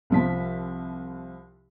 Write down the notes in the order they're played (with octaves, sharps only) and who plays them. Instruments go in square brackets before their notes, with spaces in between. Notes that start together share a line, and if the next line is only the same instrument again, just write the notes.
[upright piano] C2 F3 B6